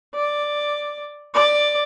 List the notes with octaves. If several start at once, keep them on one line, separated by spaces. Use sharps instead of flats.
D5
D5